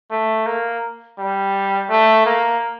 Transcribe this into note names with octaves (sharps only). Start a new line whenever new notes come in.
A3
A#3
G3
A3
A#3